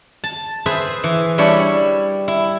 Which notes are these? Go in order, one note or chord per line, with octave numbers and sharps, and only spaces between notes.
A5
G#4 B4 C5 E5
E3
G3 D4 E4 C#5
E4